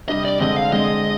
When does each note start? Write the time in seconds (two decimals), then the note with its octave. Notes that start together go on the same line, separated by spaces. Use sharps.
0.08 C3 G3 D4 G4 D#5
0.25 D5
0.40 D3 G#3 C4 D#5
0.56 F5
0.72 D3 G#3 C4 D#5